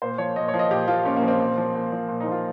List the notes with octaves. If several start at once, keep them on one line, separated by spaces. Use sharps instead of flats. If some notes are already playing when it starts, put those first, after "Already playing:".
A#2 C5
F3 C#5
A#2 D#5
C#5
F3
D#5
A#2 G4
F3 F4
A#2 C#4
A#3
F3
C4
A#2
F3
A#2
F3
A#2
D#4
F3
F4